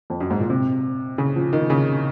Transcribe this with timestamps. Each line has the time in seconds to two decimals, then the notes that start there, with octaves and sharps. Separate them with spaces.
0.10 F2
0.20 F#2
0.30 G#2
0.40 A#2
0.50 C3
1.18 C#3
1.36 F3
1.53 D#3
1.70 C#3